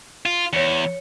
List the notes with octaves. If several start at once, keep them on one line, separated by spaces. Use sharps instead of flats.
F4
E2 C#5 C#7